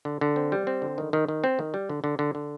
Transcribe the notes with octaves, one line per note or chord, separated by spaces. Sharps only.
D3
D3
C4
G3
C4
D3
D#3
D#3
D#3
C4
D#3
G3
D3
D3
D3
D3